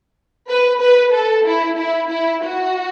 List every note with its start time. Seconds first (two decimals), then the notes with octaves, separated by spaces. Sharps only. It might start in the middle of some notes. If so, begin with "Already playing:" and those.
0.48 B4
0.80 B4
1.14 A4
1.46 E4
1.78 E4
2.11 E4
2.44 F#4